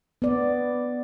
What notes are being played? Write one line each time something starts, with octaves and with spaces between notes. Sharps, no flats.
B3 D5